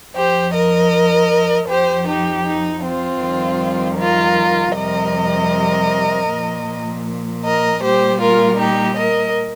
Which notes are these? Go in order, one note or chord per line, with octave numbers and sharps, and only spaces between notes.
F2 F3 G4 C5
A#4 D#5
F2 F3 G4 C5
D#4 G4
D#4
C4 F4
F2 D#3 G3
F4 A#4
F2 C3 G3 A#4 D#5
A#2 F3
A#4 D#5
A#2 G3 G4 C5
F4 A#4
D#4 G4
A#4 D#5